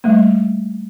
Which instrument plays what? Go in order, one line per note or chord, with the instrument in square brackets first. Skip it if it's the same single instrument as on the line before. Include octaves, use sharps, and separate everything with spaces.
[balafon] G3 A3 A#3